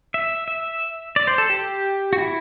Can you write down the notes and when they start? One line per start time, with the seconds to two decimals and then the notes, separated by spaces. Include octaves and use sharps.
0.14 E5
0.48 E5
1.16 D5
1.27 C5
1.38 A4
1.50 G4
2.13 F#4
2.18 E4